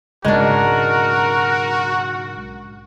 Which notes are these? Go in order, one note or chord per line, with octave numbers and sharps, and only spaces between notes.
B1 G#2 C#3 G#3 D4 F#4 A#4